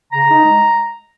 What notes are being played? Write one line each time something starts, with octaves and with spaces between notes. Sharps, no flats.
C#3 A#5
D#4
G#3